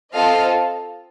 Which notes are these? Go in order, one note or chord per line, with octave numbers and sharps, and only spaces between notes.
C4 F4 A4 D#5 F5